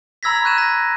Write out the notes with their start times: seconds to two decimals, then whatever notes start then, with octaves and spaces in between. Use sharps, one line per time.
0.23 A#5 B5 E6 G#6 A#6 B6
0.44 C#6 E6 F#6 G6 D#7 E7
0.58 A#6